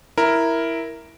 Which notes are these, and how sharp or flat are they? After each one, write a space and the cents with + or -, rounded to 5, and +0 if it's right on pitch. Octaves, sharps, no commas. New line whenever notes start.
E4 +0 A#4 +0